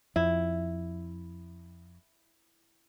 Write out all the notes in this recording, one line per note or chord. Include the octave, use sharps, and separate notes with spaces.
F2 E4